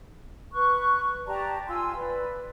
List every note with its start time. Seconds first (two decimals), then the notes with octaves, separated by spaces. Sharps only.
0.52 B4 C#6 F#6
1.26 G4 D5 A5 A#5
1.68 F4 G#5 C6 E6
1.95 B4 D5